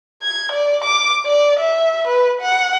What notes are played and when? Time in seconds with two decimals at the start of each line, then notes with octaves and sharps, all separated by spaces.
0.22 G#6
0.52 D5
0.84 D6
1.26 D5
1.60 E5
2.08 B4
2.41 F#5